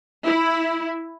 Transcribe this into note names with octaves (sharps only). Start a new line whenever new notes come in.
E4